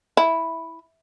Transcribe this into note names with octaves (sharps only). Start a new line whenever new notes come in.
E4